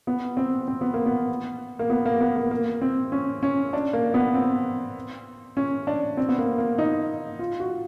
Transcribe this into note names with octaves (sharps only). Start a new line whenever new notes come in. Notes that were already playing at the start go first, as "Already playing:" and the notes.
B3
C4
C4
B3
A#3
B3
A#3
B3
A#3
B3
A#3
A#3
C4
C#4
C#4
D4
A#3
B3
C4
C#4
D4
C4
B3
A#3
A#3
D#4
F4
F#4